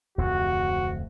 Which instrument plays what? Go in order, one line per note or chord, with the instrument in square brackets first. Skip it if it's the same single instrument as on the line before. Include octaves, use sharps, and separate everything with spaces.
[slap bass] D1 F2 C3 [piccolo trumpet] F#4